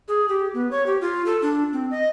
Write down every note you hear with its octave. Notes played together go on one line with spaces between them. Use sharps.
G#4
G4
B3
C#5
G4
F4
A4
D4
C4
D#5